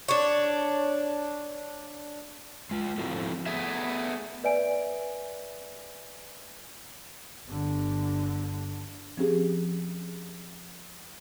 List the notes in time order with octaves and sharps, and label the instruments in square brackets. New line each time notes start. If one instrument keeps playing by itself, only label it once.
[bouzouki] D4 C#5
[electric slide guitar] G#3 F4
F3 C4 E4 F#4 A4
A3 B3 G#4 E5
[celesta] B4 D5 E5 G#5 D7
[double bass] G1 D3
[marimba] F3 C4 C#4 G4 G#4